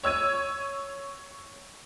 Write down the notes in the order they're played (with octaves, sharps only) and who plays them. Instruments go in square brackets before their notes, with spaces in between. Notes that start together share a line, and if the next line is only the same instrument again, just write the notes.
[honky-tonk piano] C#5 E6 G#6 D#7